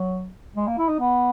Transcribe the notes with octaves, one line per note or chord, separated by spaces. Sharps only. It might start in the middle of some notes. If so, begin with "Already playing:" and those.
Already playing: F#3
G#3
A#3
E4
D#4
B3